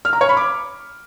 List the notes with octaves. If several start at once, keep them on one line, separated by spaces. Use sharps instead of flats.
F6
A#5
C#5
B5
D6